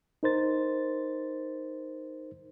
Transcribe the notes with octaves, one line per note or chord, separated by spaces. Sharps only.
D#4 A#4 C5 A6